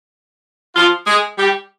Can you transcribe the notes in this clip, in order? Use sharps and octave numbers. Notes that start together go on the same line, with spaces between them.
F3 F4
G#3 G#4
G3 G4